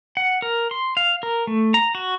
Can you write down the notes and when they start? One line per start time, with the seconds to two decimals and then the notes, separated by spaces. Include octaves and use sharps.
0.17 F#5
0.42 A#4
0.71 C6
0.97 F5
1.23 A#4
1.47 A3
1.74 A#5
1.95 F#4